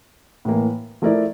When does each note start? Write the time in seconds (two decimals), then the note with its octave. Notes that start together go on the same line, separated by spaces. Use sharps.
0.45 A2 E3 A#3
1.02 F3 A3 E4 A#4 D5